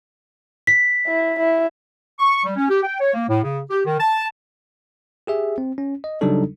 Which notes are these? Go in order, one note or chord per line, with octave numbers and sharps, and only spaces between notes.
B6
E4
E4
C#6
G3
C#4
G4
G5
C#5
A#3
A2
C#3
G4
D#3
A5
G4 G#4 E5
C4
C#4
D#5
C#3 F#3 G3 D4 D#4 A4